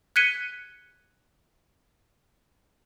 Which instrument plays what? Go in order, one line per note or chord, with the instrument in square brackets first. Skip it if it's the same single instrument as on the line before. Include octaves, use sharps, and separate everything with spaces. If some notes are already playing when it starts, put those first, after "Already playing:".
[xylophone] F#6 G#6 B6 C#7 D#7 G7